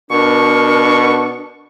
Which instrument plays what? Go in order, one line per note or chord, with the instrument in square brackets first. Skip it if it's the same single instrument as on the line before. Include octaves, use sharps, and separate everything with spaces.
[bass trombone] B2 [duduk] D4 [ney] A#4 [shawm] C#6